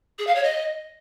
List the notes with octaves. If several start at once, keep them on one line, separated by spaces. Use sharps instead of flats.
G#4
F5
C#5
D#5